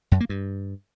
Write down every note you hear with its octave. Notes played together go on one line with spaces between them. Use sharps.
F#2
A#3
G2